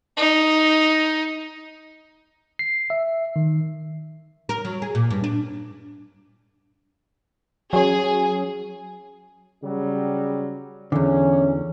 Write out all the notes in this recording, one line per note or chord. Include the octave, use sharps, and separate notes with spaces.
D#4
C7
E5
D#3
A#4
F#3
G#4
A#2
G2
D4
F#3 C#4 G#4
C#3 F#3 G3
E2 D3 E3 C#4